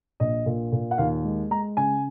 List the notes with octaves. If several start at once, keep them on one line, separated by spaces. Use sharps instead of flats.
A#1 D#5
A#2
A#2
F#5
D#2 F5
G#3
G#3 A#5
C#3 G#5